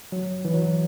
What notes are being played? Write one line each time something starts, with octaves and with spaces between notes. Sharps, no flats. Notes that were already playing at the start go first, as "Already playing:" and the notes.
F#3
E3
F#3